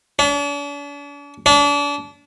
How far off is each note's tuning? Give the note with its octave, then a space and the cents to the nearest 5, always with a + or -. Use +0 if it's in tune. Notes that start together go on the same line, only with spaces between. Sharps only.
D4 -45
D4 -35